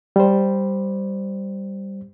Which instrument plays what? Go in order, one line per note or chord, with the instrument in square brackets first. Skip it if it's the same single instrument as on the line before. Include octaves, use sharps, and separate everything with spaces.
[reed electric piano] G3 C5